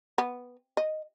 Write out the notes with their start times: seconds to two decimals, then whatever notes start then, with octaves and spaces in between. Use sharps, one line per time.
0.18 B3
0.77 D#5